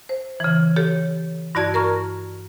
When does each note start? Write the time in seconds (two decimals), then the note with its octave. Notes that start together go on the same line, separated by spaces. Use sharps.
0.09 C5
0.40 C#3 E3
0.76 G4 A4 C#5
1.55 G2 E4 F#4 D5 A5 G#6
1.74 A#4 A#5 C#6 F6